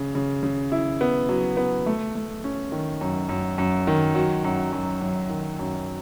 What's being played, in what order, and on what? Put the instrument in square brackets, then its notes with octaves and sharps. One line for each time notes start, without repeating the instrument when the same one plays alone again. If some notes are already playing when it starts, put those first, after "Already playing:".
Already playing: [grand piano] C#3
C#3
C#3
E4
B3
F#3
B3
A3
A3
C#4
D#3
F#2
F#2
F#2
D#3
F#3
F#2
F#2
F#2
D#3
F#2